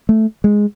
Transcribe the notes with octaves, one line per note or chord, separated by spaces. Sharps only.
A3
G#3